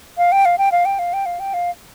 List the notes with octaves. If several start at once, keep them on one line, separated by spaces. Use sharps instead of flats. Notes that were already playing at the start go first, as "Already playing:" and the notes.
F5
G5
F5
G5
F5
G5
F5
G5
F5
G5
F5